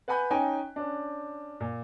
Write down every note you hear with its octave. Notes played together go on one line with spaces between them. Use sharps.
B4 F#5 G#5 B5 F#6 G6
C#4 D#4 G5 G#5 A#5
C#4 D4
A#2